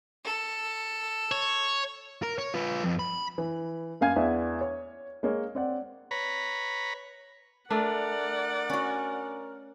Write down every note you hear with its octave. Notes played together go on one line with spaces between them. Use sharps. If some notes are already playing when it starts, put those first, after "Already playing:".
A4
C#5
A#4
C#5
F4 B4
F2
B5
E3
F#2 A#3 F5 G#5 G#6
E2 E3 D4 E5 F#5
C#5
G#3 A#3 C#5
C4 D5 F#5
B4 C#5 A#5 B5
A3 D4 A#4 D5 F#5
C#4 F#4